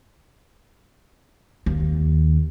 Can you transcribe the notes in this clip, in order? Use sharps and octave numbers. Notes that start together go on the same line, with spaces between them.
D#2